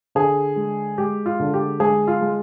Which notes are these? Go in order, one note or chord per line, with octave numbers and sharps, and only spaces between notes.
D3 G#4
G#3
G#3 G4
F4
D3
G4
G#3 G#4
F4
G#3